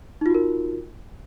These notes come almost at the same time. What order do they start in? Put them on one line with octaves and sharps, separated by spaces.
D#4 F4 F#4 A#4